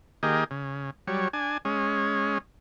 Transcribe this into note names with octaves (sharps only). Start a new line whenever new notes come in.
D#3 A#3 G4 G#4 D#5
C#3
F#3 G3 C#5
D4 G#5
G#3 C#4